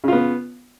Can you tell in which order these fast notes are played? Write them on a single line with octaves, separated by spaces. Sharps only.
C#3 F4 B3